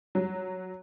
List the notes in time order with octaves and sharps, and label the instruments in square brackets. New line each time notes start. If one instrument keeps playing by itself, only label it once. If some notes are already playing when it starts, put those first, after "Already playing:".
[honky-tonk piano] F#3